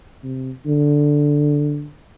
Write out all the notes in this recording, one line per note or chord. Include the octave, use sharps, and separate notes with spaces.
C3
D3